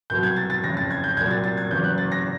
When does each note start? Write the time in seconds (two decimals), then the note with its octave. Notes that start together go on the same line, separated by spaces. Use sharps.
0.10 C2 B2 F#3 G6
0.23 G#6
0.36 A6
0.50 A6
0.64 F#1 F2 C#3 A#6
0.77 A6
0.91 G#6
1.04 G6
1.17 C2 A#2 F#3 G#6
1.31 A6
1.44 A6
1.57 G#6
1.71 F#1 E2 C#3 F#3 G6
1.84 F#6
1.98 A6
2.12 A#6